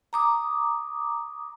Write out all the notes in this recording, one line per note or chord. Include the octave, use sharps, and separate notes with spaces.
A#5 D6 D#6